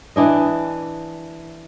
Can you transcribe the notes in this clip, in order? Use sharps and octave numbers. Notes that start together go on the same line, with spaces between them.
E3 D4 D#5